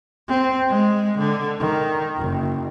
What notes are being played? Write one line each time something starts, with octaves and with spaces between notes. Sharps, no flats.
C4
G#3
D3
D#3
F#1